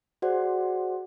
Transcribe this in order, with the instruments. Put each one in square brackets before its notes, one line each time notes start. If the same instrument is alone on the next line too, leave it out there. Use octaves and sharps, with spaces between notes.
[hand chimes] F#4 G#4 C5 D5 F#5